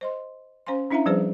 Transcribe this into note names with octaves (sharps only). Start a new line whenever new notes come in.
C5 D#5 C6
C#4 C5 F5 G#5 C6
C#4 D4 E4 E5 F5 A#5
F3 G3 C4 G#4 B4 C5